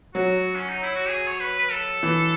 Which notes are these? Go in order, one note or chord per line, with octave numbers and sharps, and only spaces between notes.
F#3 F#4
C#4
D#4
E4
F#4
G#4
C#5
B4
B4
A4
E3